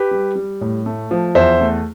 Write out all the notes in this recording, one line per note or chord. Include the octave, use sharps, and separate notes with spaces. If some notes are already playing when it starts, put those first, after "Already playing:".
Already playing: G4 B4
G3
G3
A2
A3
F3
E2 C5 E5
A3